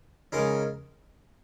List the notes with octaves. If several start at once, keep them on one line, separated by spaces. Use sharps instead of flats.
C#3 G#3 D#4 A#4